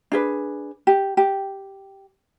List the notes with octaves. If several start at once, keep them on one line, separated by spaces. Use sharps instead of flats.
D4 G#4 B4
G4
G4